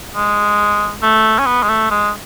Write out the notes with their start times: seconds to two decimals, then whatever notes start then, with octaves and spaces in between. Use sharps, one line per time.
0.15 G#3
1.02 A3
1.39 C#4
1.46 B3
1.63 G#3
1.69 A3
1.90 G#3